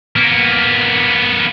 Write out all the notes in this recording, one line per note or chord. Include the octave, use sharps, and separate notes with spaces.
A#3 B3